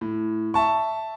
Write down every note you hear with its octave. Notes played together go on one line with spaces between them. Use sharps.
A2
E5 A5 C#6